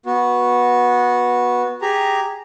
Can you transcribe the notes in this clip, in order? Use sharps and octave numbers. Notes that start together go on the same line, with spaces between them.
B3 F#4
G4 G#4 A#5